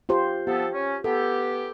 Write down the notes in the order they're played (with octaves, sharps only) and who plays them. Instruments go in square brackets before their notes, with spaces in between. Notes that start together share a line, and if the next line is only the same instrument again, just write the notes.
[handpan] F4 G4 C5
[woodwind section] F3 B3 A4 [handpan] G4
[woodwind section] C#4
[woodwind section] B3 G4 [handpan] A4